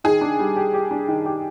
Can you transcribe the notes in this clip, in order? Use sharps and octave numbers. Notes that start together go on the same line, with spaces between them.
D#3 G#4
D4
G3
G4
G4
D4
D#3
G4